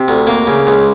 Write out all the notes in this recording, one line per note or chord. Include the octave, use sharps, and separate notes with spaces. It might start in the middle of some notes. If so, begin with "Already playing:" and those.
Already playing: C3
D2
A#3
C#3
C#2